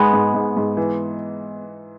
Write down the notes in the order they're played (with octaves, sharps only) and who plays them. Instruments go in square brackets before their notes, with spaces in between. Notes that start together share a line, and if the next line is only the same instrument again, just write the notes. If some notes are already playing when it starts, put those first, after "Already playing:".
Already playing: [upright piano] G#2 [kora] G#3 B3
[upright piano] G#2
G#2
G#2
E3